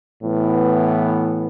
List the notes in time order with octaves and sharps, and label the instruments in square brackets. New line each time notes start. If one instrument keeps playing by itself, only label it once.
[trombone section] A2 E3 B3